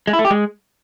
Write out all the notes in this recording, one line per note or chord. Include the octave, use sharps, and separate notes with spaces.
G#3
E4
A3
G4
G#3